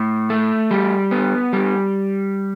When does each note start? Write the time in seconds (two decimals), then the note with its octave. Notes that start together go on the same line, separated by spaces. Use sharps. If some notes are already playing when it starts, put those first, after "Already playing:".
Already playing: A2
0.30 A3
0.71 G3
1.11 B3
1.53 G3